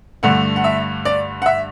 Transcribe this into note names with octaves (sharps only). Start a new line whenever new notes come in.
G2 D3 A3 F#5
F#5
E5
D5
F#5
E5